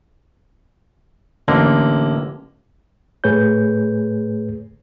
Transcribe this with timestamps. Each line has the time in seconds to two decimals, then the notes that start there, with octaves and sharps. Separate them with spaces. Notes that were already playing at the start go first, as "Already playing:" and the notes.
1.48 A1 D3 A#3
3.24 A2 A3 G#4 B4 C#5 G6